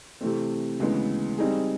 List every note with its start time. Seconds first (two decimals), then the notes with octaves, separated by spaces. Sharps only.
0.21 C3 E3 A3 C4
0.80 D2 C#3 E3 G#3 B3
1.38 G3 C4 D#4 G#4